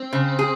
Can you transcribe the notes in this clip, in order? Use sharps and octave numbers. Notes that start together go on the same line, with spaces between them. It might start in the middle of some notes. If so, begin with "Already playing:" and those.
Already playing: C4
C#3
G#4